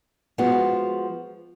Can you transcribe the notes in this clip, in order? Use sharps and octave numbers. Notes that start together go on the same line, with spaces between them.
F3 G#3 B3 F#4